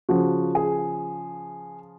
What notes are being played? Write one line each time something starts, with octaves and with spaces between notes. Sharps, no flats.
C#3 F3 F#4
G#4